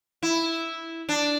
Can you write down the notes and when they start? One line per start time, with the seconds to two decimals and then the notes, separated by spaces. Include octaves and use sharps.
0.23 E4
1.09 D4